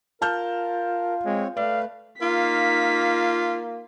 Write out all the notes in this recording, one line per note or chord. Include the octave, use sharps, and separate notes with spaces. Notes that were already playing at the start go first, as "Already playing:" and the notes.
F4 A#4 A5 F6 G6
G#3 C4 C#5
A3 B4 D5 F5
A#3 D#4 F4 B6